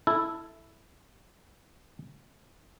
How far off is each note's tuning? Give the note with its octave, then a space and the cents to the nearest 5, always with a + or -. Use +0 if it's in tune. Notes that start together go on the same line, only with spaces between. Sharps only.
E4 +0 A4 +0